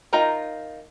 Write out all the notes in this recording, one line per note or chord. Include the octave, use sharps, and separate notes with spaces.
D#4 F4 A#4 G5 A#5